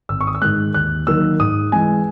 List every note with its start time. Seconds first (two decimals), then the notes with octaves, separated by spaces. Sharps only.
0.09 G#1 E6
0.21 C#6
0.27 D#6
0.35 E6
0.42 G#2 D#3 G#3 F#6
0.74 D#2 F#6
1.07 D#3 F#3 A#3 E6
1.40 G#2 D#6
1.72 E3 G#3 G#5